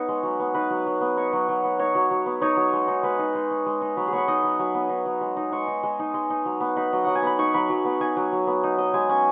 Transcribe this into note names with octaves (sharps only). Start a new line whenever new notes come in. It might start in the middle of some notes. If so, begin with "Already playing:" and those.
Already playing: B3 D#4 C#5
G#3
F#3
B3
D#4 B4
F#3
F#3
B3
D#4 C#5
F#3
F#3
B3
D#4 C#5
F#3
F#3
B3
D#4 C#5
F#3
G#3
D#4
G#3 B4
D#4
G#3
D#4
G#3
D#4
F#3 B4
G#4
B3 B4 C#5
D#4 D#5
F#3
F#3 G#5
B3
D#4
F#3
G#3
D#4
G#3 C#6
D#4
G#3
D#4
G#3
D#4
F#3
B3
D#4 B5
F#3 D#5
F#3 F#5
G#5
B3 B5
D#4 C#6
F#3 B5
F#3
B3
D#4 G#5
F#3
F#3
B3
D#4
F#3 D#5
G#3 G#5
C#4 G#5